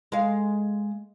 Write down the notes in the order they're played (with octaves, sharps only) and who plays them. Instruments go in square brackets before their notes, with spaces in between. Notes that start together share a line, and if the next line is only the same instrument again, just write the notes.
[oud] G#3 F5